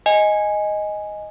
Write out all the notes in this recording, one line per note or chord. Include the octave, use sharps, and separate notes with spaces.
D#5 G#5